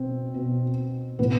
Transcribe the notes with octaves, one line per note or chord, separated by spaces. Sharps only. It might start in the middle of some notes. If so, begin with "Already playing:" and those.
Already playing: B2 C4
B2
A2 E3 B3